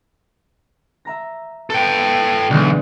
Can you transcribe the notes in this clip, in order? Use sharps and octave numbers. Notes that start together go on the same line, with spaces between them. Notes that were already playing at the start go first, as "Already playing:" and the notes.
E5 A#5 A#6
A4 B4 G5
B1 D3 E3 G#3